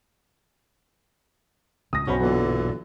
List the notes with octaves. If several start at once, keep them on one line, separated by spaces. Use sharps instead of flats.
C#2 A2 D#6 A#6
B1 G2 B2 B3 C#4 F#4 C5 B5
A#2 D3 E3 F#3 B3